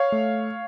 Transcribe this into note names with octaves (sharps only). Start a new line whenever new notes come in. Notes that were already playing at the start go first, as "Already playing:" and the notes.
Already playing: C#5 F5
A3